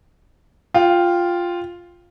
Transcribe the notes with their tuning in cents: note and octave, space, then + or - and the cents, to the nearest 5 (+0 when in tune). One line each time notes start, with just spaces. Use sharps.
F4 +0 G5 +0